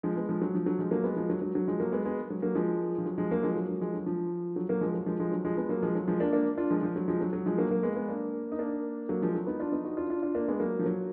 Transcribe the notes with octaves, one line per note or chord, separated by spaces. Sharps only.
F3 G#3
G#3 B3
F3 G#3
F#3
F3
F#3
F3 G#3
F#3 A#3
G#3 B3
F3 G#3
F#3
F#3
F#3
F3 G#3
F#3 A#3
G#3 B3
G#3 B3
F#3
F#3 A#3
F3 G#3
F3
F#3
F3 G#3
F#3 A#3
F3 G#3
F#3
F#3
F3 G#3
F#3
F3
F#3
F#3 A#3
F3 G#3
F#3
F3 G#3
F3 G#3
F#3
F3 G#3
G#3 B3
F#3 A#3
F3 G#3
F#3
F3 G#3
A#3 D4
A#3 D4
D4 F4
F3 G#3
F3
F#3
F3 G#3
F#3
F#3
F3 G#3
F#3 A#3
F#3 A#3
G#3 B3
G#3 B3
A#3 D4
D#4
A#3 D4
F#3 A#3
F3 G#3
F#3
B3 D#4
D4 F4
B3 D#4
D#4 F#4
D4 F4
D4 F4
D4 F4
A#3 D4
G#3 B3
F#3 A#3
F3
F#3